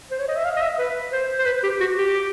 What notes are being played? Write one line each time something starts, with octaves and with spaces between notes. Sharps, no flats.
C5
C#5
D#5
E5
F5
D#5
E5
B4
C5
C5
B4
G4
F#4
G4